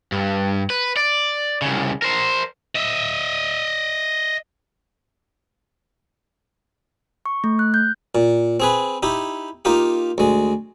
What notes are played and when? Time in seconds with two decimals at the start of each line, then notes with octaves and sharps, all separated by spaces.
0.12 G2
0.70 B4
0.97 D5
1.62 C2 C#3
2.02 A#4 C5
2.76 D#5 E5
7.26 C#6
7.44 A3
7.59 F#6
7.74 G6
8.15 A#2
8.60 C4 G#4 B4
9.03 D#4 E4 G4
9.65 A#3 D#4 F4 G4
10.18 D2 G#3